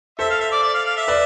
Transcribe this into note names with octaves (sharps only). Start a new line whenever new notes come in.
A4 C5 E5
F5
E5
D5
D5
F5
F5
E5
B4 D5